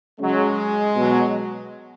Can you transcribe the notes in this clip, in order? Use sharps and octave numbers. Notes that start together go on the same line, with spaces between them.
C#3 F#3 G#3
B2 F#3